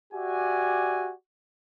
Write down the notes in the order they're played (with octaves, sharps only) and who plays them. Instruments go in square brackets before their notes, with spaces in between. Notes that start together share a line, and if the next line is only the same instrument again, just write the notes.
[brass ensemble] F#4 G4 D5 E5 G#5